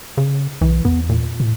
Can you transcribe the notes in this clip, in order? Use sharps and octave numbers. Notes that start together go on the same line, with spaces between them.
C#3
B1 E3
E2 B3
A#2
A2